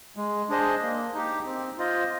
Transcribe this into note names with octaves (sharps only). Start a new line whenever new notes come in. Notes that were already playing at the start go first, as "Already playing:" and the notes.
G#3
D4 G#4 C5 D#5
A#3
D#4 G4
C4
F4 C5 D#5